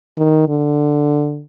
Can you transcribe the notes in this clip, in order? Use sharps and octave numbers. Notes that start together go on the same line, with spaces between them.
D#3
D3